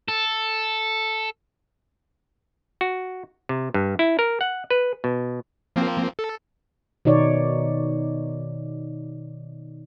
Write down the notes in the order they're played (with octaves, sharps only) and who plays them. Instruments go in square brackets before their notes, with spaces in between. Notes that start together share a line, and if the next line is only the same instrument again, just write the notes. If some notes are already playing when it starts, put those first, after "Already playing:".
[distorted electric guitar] A4
[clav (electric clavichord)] F#4
C3
G2
E4
A#4
F#5
B4
B2
[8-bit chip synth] F3 A#3 C4
A4
[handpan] B2 D#3 D#4 C#5 D5